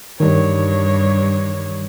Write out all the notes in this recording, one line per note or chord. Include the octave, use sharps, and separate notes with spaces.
G2 D#3 G3 C#5